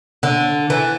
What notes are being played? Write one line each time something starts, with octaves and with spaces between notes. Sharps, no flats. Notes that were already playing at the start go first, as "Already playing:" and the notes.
D3
E3